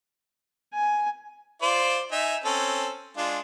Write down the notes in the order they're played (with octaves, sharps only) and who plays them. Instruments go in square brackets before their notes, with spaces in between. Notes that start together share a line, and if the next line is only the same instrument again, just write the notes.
[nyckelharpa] G#5
[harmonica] F4 C5 D5
D#4 E5 G#5
C4 C#4 A4
G#3 D4 F4